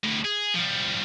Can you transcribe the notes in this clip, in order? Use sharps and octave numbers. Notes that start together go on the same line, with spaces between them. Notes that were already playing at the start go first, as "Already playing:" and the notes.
D2 A2
G#4
F3 G3